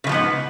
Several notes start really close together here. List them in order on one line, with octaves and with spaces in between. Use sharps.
C#3 G#3 F3 B3 G#2